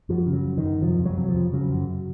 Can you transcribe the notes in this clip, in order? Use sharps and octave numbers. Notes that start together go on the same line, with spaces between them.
F#2 F3
C#3
F#3
F#2
D#3
F#2
C3 F3
F2
F#3
C3
F3
F2
C#3 F#3
F#2